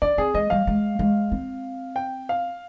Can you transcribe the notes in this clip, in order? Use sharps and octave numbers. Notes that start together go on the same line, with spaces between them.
D4 D5
C4 G#4
G#3 D#5
G3 F5
G#3
G#3
C4
G5
F5